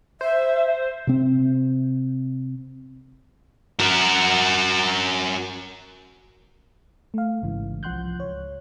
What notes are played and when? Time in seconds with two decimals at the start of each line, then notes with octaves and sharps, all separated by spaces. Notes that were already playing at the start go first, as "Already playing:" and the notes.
0.21 C5 E5
1.07 C3 C4
3.80 F#4 A#4
7.14 A3 F5
7.42 A1 G#2 C#3 E3
7.83 C2 F3 F#5 C6 F#6 G6
8.19 C#2 C#5